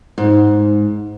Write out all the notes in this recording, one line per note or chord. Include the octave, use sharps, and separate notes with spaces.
G#2